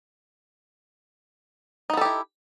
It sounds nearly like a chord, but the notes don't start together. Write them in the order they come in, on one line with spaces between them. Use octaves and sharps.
D#4 B3 A4 G4 E4